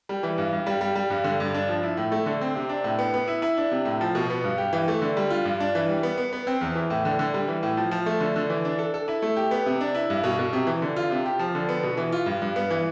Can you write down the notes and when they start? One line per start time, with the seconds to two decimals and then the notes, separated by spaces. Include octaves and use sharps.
0.09 G3
0.23 E3
0.38 G2
0.53 G2
0.66 G3
0.81 G3
0.95 G3
1.10 G2
1.24 D3
1.40 G2
1.54 D4
1.68 F3
1.83 E4
1.97 A2
2.12 A3
2.26 D3
2.41 C4
2.55 C3
2.69 D4
2.84 A2
2.99 B3
3.14 B3
3.28 E4
3.42 E4
3.57 D4
3.71 C3
3.85 A2
4.01 F3
4.15 B2
4.30 B3
4.44 G2
4.58 G4
4.73 E3
4.88 A3
5.02 D3
5.17 G3
5.30 F4
5.45 G2
5.60 D4
5.75 E3
5.89 G3
6.03 B3
6.18 B3
6.33 B3
6.47 C4
6.61 E2
6.75 E3
6.90 A2
7.05 D3
7.19 D3
7.34 G3
7.48 E3
7.63 A2
7.77 F3
7.91 F3
8.06 A3
8.20 D3
8.36 D3
8.50 E3
8.65 D4
8.78 A4
8.94 A4
9.08 E4
9.22 A3
9.37 G4
9.51 B3
9.66 C3
9.81 D4
9.95 E4
10.10 G2
10.24 B2
10.39 B2
10.53 C3
10.67 E3
10.82 D3
10.96 F4
11.11 C3
11.26 G4
11.39 F3
11.55 D3
11.69 B3
11.83 B2
11.97 E3
12.12 F4
12.26 G2
12.42 G2
12.56 B3
12.71 E3